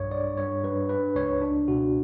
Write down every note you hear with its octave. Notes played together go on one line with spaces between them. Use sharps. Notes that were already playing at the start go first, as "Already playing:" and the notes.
Already playing: B1 G2 C#5
G2 D5
G2 C#5
G2 B4
D4 B4
C#2 C#5
D4
B2 F#4